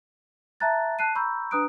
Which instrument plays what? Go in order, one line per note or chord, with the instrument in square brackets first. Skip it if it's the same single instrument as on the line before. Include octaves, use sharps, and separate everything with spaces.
[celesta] E5 A5 A#5 F#6 A6
A5 F#6 C7 D#7
A#5 B5 C#6 E6 G6
D4 B4 A#5 D#6 F#6 D7